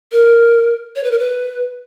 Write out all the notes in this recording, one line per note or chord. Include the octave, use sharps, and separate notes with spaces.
A#4
C#5
B4
A#4
B4